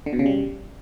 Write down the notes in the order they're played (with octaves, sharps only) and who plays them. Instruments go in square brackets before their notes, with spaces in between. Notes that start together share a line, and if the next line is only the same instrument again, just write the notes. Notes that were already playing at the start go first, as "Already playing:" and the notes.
[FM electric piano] D3
B2
C#3
G3